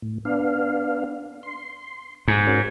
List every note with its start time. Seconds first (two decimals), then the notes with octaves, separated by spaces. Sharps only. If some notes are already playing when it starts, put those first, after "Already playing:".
0.02 A2
0.25 B3 D4 F5
1.43 C6
2.28 G#2
2.47 C#4 F#4 A#4